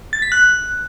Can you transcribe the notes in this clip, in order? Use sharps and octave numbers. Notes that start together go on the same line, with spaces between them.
A6
B6
F#6